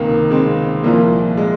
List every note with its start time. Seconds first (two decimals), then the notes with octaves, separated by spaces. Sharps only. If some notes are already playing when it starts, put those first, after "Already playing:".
Already playing: C#2 C3 D#3 A#3
0.31 G#3 C4
0.83 C2 A#2 F3 A#3
1.37 G#3